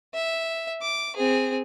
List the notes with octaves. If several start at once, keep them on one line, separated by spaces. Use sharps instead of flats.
E5
D6
C4 G#4